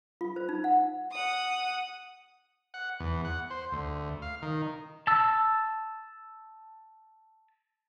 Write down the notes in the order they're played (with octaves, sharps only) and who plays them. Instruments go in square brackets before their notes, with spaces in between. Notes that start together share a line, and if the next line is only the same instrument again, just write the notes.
[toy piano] F4
C5
D#4
F#5
[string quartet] F#5 D#6
[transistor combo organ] F#5
E2
F#5
C5
D2
F5
D#3
[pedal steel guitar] A5 E6